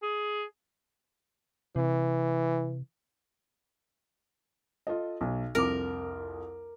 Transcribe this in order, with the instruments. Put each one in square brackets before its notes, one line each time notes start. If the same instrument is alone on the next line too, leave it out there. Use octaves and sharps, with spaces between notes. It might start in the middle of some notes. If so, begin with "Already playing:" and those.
[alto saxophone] G#4
[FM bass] C3 [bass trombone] E3
[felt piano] F4 A4 D#5
B1
[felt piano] C2 F2 D6 [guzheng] A#4